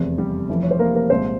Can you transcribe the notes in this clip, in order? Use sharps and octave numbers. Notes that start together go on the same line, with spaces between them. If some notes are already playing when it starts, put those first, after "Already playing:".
Already playing: F1 E2 C3
G3 G4
F1 F2 E3
C#5
C5
A#3 A#4
A#3 A#4
C2 A#2 G#3 C4 C5